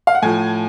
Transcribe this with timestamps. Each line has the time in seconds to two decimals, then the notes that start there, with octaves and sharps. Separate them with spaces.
0.07 F5
0.15 F#5
0.22 A2 F3 G#5